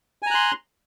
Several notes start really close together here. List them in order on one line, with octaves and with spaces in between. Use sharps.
G#5 A#5 F#6 C6